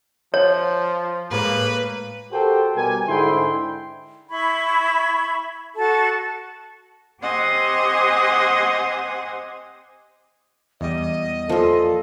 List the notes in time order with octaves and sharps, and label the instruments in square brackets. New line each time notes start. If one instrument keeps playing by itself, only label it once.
[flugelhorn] F3 [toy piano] C#5
[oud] A2 G#3 [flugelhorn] A#3 [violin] B4
[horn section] F#4 G4 A4 A#4 C5 G5
B2 G3 G4 A#4 G#5
G#2 D3 E4 G#4 G5 C6
[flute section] E4 B5 C#6 G#6
F#4 A4 A5
[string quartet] C4 G4 C5 D#5 F#5 G#5
[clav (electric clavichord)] E2 G3 [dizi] D#5
[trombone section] A#2 A4 [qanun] F3 F4